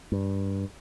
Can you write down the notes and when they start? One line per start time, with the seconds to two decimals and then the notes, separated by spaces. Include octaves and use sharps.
0.12 G2